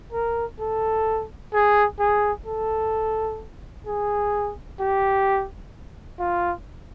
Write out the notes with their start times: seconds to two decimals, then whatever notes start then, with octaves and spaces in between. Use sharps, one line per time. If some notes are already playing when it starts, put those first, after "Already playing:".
0.13 A#4
0.60 A4
1.53 G#4
1.99 G#4
2.46 A4
3.86 G#4
4.80 G4
6.19 F4